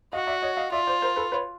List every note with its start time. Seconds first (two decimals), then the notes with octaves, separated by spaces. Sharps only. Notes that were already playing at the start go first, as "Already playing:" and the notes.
0.13 F#4 D#5 F5
0.27 D5 E5
0.42 C#5 D#5
0.57 D#5 F5
0.72 F4 D5 E5
0.87 C5 D5
1.02 A#4 C5
1.16 A4 B4
1.32 B4 C#5